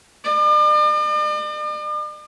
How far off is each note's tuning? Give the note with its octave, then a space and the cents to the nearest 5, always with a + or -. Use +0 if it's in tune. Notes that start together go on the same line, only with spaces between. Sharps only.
D5 +45